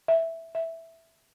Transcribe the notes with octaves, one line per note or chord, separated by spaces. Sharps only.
E5
E5